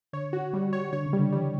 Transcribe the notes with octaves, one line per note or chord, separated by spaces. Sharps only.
D3 C#5
F#4
G3
C#5
D3 C#5
C#3
G3
D3
E3 G3